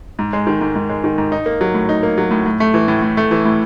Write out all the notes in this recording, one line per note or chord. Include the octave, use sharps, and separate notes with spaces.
G#2
G#3
D#3
G#2
G#2
G#3
D#3
G#2
D#4
A#3
F#3
A2
D#4
A#3
F#3
A2
A2
A3
E3
A2
A2
A3
E3
A2